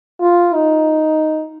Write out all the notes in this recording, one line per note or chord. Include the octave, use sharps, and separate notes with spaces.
F4
D#4